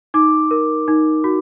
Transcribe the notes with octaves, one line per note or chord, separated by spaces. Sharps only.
D#4 D6
A#4
D#4
F#4